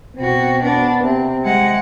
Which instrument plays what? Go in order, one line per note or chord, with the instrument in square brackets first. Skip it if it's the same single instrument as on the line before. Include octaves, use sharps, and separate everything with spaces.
[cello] B2 F#4 [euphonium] C4
[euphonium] B3 [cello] D4
[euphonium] C3 [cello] C4
[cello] G#3 F#5